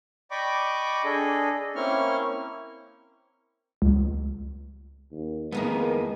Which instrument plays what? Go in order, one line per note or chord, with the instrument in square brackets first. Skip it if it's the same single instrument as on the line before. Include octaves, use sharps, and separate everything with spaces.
[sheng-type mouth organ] D5 D#5 G5 B5 C#6 D6
D4 G#4 A4 D#5
A#3 C4 C#4 E4 C#6 F6
[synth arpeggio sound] C#2
[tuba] D#2
[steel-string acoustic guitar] F2 D#3 E3 [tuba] G#3 [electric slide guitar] A#3 B3